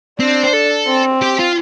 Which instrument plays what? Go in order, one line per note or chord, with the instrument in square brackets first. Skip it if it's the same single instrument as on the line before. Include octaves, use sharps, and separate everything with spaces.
[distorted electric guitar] C4 [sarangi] D4
[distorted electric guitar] C5
A4
[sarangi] C4
[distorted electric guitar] G4
F4